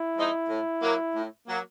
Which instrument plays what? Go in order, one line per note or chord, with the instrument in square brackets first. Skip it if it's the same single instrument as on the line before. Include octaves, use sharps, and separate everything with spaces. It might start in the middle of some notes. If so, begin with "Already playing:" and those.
Already playing: [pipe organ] E4
[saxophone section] F3 G#3 C4 D#4
A2
F#3 A#3
A2
F#3 A#3